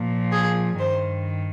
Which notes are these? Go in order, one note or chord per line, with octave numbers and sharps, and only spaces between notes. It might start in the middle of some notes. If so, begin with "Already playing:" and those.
Already playing: A#2 F3
G#4
G2 D#3 C5